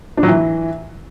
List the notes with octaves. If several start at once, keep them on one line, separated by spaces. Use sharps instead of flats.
D4
F#3
E3